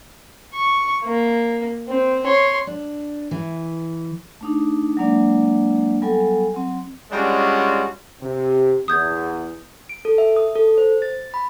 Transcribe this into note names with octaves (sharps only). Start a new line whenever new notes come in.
C#6
A#3
C4
C#5 C6
D4
E3
A3 D4 D#4
F#3 G#3 A#3 D4 D5
F#3 G3 B3 A4 G#5
F#3 C4
G3 G#3 C#4 D4 F4 F#4
C3
E2 D#6 G6 G#6
D7
A4
E5
D#6
A4
C5
A6
B5